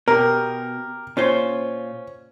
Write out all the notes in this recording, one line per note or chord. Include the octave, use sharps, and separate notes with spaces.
B2 G4 A#4
A#2 C#4 F4 C5